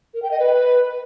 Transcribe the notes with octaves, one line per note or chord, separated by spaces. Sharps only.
A#4
G5
D#5
B4